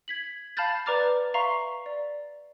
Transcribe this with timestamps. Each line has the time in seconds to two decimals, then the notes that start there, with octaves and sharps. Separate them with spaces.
0.08 G#6 B6 F#7
0.57 F5 A5 B5 F6 G6 A6
0.86 B4 D5 A#5 D6 F6 A6
1.34 E5 F5 A#5 C6 C#6
1.86 D5